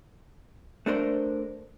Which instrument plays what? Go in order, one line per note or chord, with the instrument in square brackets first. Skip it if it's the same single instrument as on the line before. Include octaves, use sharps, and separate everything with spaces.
[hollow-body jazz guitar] A3 D4 A#4 C5